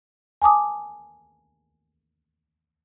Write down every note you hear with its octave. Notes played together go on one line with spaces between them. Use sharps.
G#5 A5 D6 D#6